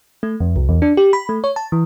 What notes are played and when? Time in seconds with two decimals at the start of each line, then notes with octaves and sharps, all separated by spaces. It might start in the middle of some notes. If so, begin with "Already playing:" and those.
0.23 A3
0.40 F2
0.56 C2
0.69 E2
0.82 D4
0.97 G4
1.13 B5
1.29 A3
1.44 C#5
1.56 A5
1.72 E3